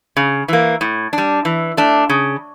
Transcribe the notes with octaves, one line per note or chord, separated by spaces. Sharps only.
C#3
E3 A#3
A2
D4
G3
E3
A3 D4
C#3